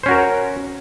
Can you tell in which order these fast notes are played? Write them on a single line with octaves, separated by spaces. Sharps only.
C5 C#4 F#4 A#4